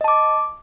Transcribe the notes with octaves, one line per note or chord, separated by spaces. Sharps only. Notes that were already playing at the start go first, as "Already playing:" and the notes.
D#5 A5 D6